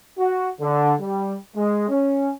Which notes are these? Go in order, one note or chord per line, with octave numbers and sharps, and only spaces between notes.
F#4
D3
G3
G#3
C#4